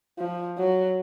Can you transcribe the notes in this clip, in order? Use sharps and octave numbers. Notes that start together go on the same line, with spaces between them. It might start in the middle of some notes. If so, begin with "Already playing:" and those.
F3
F#3